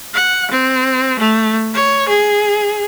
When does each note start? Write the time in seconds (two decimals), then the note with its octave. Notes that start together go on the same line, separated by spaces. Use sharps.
0.14 F#5
0.51 C4
1.19 A3
1.74 C#5
2.08 G#4